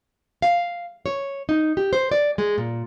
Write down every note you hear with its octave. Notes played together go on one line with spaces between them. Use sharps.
F5
C#5
D#4
G4
C5
D5
G#3
A#2